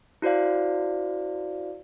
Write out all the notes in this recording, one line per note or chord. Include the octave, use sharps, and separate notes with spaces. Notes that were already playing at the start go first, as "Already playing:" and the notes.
E4 F#4 C5 D5 F5